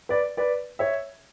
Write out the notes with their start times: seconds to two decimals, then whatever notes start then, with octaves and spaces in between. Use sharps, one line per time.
0.09 B4 D5
0.37 B4 D5
0.79 C#5 E5